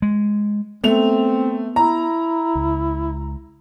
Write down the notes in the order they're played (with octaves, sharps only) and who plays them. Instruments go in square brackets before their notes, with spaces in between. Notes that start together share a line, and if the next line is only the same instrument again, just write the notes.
[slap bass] G#3
[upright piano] A3 F7 [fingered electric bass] B3 [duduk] C4
[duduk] E4 [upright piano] A#5
[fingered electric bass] C#2